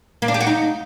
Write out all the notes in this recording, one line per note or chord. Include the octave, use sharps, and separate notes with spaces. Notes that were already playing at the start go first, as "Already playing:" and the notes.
A#3
D4
G4
F#4
D#4